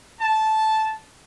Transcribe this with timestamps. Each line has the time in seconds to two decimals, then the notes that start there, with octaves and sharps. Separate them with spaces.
0.21 A5